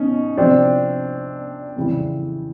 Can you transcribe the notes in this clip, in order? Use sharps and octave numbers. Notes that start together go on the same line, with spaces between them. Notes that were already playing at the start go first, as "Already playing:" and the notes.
Already playing: B2 C#4 D#4
C2 C3 F3 C4 D4
F2 C#3 E3 G3